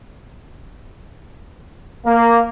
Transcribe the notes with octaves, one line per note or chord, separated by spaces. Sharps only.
A#3